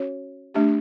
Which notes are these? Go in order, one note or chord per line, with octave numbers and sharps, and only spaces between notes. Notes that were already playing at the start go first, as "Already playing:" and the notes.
Already playing: C#4 F#4 C#5
A3 D4 G4